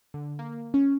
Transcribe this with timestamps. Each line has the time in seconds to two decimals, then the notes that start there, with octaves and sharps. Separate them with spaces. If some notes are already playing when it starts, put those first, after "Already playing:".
0.14 D3
0.39 A#3
0.74 C#4